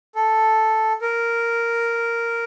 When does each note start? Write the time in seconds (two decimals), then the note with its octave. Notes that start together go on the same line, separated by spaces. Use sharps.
0.15 A4
1.01 A#4